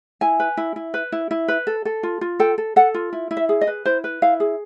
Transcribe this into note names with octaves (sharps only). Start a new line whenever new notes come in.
E4 G#5
B4
E4
E4
B4
E4
E4
B4
A4
A4
F4
F4
A4 G5
A4
A4 F#5
F4
E4
E4
E5
G#4
D#5
B4
E4 C5
B4
E4 F5
G#4